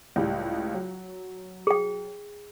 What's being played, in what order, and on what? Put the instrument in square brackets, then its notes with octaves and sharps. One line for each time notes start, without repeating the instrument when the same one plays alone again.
[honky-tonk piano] C#2 A2 G3
F#3
[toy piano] G#4 G5